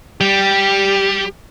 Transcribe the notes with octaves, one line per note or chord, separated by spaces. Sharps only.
G3 G4